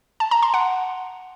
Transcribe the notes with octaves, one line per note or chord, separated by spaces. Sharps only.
A5
A#5
C6
F#5